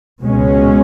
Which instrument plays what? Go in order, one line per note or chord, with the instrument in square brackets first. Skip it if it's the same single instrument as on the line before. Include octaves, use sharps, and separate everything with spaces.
[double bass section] C#2 B2 G#3 C#4